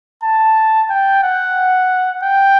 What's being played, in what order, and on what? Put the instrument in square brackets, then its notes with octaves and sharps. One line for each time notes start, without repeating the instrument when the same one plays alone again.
[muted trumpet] A5
G5
F#5
G5